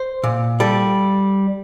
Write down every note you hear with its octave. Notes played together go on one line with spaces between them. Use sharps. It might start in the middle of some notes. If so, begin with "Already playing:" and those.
Already playing: C5
A#2
G3 A4